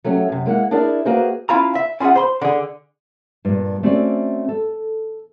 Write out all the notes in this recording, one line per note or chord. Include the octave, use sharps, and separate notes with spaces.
F#3 A3 C#4 F#4 G4
F#2 C3
G#3 A#3 E4 F#5
D4 E4 G#4 A#4 D5
A#3 F#4 G#4 B4 C5
C#4 E4 F4 F5 A#5
E5
C#4 F4 G#4 E5 F#5
C5 B5 C6
D3 G#4
G2 A#2
A3 C4 C#4 F#4 D5
A4